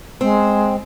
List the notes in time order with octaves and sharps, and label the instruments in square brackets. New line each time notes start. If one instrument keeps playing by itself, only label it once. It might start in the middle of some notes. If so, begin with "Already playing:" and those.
[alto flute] G#3 [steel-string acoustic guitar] C4